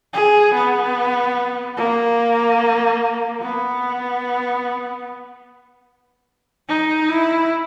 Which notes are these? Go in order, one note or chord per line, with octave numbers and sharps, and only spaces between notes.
G#4
B3
A#3
B3
D#4
E4